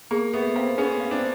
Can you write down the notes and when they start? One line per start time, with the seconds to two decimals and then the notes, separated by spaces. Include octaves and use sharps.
0.11 A#3 G#4
0.33 A3 B3 G#4
0.55 A#3 C4 F5
0.78 B3 C#4 G#4
1.00 F5
1.11 C4 D4